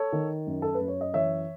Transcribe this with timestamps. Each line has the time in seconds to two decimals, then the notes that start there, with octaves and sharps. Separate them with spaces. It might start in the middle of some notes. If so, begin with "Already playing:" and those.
Already playing: A4 C#5
0.13 D#3
0.47 F#2
0.62 A4
0.75 B4
0.80 F#2
0.88 C#5
1.01 D#5
1.14 E3 C#5 E5